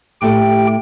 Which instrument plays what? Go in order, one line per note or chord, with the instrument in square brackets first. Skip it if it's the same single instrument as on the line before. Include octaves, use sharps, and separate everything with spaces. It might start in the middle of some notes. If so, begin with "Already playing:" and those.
[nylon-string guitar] A2 A3 [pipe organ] G4 G5